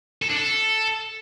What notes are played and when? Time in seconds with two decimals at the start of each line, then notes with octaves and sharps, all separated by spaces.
0.22 A4
0.29 D4
0.37 A4